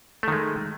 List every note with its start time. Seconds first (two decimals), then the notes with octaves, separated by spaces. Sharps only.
0.23 A3
0.28 D#3
0.32 G#3